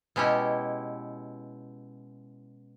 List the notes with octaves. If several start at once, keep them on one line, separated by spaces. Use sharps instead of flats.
B2 G#3 C#4 E4 G4